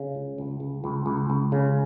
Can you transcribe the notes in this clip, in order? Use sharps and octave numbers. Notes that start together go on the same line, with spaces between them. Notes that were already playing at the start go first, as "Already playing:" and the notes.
Already playing: C#3
C#2
C#2
C#2
C#2
C#2
C#2
C#3